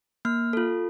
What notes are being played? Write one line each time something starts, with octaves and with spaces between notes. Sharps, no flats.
A#3 F6
F4 A4